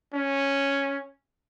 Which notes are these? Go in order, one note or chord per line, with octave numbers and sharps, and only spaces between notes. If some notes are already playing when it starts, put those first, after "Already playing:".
C#4